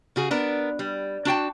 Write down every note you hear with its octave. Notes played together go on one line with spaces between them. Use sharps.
C#3 F#4 G#4
B3 D4 A#4
G3
D4 F#4 G5 A5